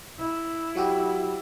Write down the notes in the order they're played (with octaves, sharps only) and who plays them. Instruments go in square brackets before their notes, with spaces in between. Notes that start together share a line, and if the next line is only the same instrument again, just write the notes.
[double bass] E4
[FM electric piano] F#3 F#4 G4